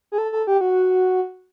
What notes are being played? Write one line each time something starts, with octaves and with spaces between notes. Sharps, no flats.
G#4
A4
A4
G4
F#4